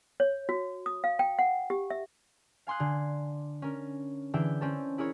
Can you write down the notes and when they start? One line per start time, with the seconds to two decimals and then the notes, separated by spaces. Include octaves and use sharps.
0.20 C#5
0.49 F#4
0.86 D#6
1.04 F5
1.19 G5
1.39 F#5
1.70 G4
1.90 E5
2.67 F5 G#5 C6 D#6 F#6
2.80 D3
3.62 C#4 A#4
4.34 D3 E3 G#4 E5 G5 E6
4.61 C4 C#4 A4
4.98 E4 G#4 A#4 C#5